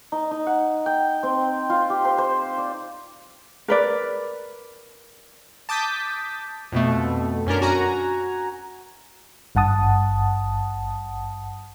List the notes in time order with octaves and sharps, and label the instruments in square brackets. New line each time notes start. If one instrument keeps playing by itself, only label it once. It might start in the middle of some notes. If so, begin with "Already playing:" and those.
[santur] D#4
D#4
F#5
G5
C4
F4
G4
C5
C5
D5
[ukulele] A#4 B4 D5
[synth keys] A5 D6 D#6 G6 B6
F2 B2 A3
F#2 C#4 D4 A#4
F#4 G#5 A#5
[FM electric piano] G#1 G2 F#5 A5 D#6